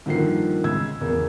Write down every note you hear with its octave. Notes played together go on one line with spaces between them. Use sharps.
G2 D3 D#3 F3 A#3 C7
C#3 G#3 E6 G#6
E2 C#3 A#3